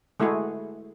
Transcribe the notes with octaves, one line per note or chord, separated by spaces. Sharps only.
G#3 A3 E4 F#4 G#4